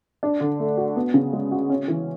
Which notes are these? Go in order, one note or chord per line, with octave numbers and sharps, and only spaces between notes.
D4
D3
A3
F#4
B3
C#3
G#3
F#4
C#4
E3